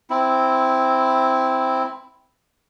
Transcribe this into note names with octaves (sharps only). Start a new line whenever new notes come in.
C4 E4